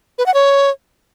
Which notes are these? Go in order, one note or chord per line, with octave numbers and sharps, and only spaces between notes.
B4
F#5
C#5